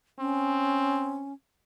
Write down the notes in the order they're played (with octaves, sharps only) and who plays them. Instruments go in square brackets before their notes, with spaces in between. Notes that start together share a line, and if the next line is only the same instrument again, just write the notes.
[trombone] C4 [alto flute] C#4